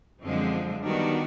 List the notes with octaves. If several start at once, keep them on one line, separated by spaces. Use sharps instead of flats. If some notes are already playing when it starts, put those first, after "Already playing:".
F#2 D3 F3 G#3 C4
D#3 G3 B3 D4 F#4